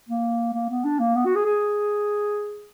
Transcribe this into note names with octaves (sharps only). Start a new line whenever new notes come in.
A#3
A#3
B3
D4
A#3
B3
F#4
G#4
G#4